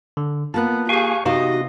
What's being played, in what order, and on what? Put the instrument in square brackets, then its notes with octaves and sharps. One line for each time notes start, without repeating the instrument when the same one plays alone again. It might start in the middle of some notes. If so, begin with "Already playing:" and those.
[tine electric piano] D3
[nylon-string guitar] A#3 F4 [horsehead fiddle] B3 [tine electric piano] A5 F#6
[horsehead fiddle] G4 G#4 [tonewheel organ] F5 G#5 C#6
[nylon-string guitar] C3 B3 F5 [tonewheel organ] D#4 F#4 [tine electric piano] G4 [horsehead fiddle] D#5